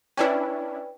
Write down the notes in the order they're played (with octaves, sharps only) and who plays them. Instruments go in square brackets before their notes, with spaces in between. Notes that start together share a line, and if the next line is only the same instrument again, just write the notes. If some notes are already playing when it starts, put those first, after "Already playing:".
[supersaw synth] C#4 D4 E4 [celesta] B4 D5 G5